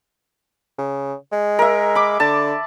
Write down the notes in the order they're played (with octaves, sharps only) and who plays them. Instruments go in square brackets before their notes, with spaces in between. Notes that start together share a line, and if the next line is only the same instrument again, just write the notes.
[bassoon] C#3
G#3
[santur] A#4 E5
B5 D6
[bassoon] D3 [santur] A5